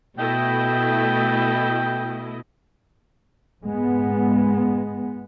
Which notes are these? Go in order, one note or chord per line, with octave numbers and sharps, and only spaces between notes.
B2 A3 E4 D#5 G5
G#2 G#3 B3